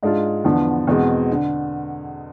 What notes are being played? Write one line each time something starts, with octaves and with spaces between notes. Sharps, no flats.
G#2 G#3 D4 F4
E2 D3 F3 B3 D4
E2 B2 G#3 C4
D3